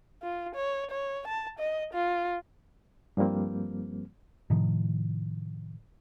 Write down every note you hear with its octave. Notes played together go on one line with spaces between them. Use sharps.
F4
C#5
C#5
A5
D#5
F4
G2 F3 G3 A#3 C4
A2 C3 D#3 F3